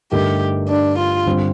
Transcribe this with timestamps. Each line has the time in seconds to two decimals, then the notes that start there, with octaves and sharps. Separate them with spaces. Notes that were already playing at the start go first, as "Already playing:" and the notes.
0.12 G2 D3 A3 D#4 G4 A#4
0.70 D4
0.98 F4
1.26 G2 D3 G3 C4